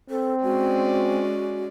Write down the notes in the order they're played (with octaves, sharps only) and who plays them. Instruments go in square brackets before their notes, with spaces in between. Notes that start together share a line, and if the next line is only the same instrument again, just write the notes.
[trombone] C4 [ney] A4
[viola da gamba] G#3 C#4 D5 [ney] F#4